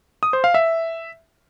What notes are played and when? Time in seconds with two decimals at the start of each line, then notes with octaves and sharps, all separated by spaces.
0.23 D#6
0.33 C5
0.44 F5
0.54 E5